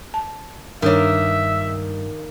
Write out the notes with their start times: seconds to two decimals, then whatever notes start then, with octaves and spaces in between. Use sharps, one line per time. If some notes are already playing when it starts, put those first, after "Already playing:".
0.14 A5
0.82 G2 D#3 A#3 D4 C#5 E5